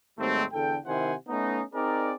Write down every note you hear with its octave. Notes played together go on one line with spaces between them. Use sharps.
D#2 G#2 G3 A3 C4
E2 D3 A4 G5
C3 D#3 E4 C5 F#5 G#5
A3 B3 C#4 D#4
C4 D#4 G#4 A#4 D5